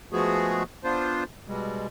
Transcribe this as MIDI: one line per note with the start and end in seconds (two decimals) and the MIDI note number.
0.12 0.63 53
0.12 0.63 56
0.12 0.63 57
0.12 0.63 59
0.12 0.63 66
0.12 0.63 68
0.84 1.24 59
0.84 1.24 62
0.84 1.24 65
0.84 1.24 72
1.47 1.87 47
1.47 1.87 55
1.47 1.87 56